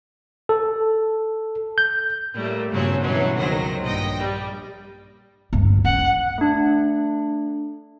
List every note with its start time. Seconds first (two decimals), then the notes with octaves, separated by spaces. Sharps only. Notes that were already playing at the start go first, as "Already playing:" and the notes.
0.49 A4
1.78 G6
2.35 A2 G3 A3 A#3
2.71 G2 A#2 C#3 F#3 C4 C#4
3.01 B2 E3 F#3 C#4
3.36 C#2 D#3 F#3 C5 A#6
3.83 A#1 G2 D#5 G5 A#6
4.18 G3
5.53 D2 G2
5.84 C#4 F#5
6.38 A3 D4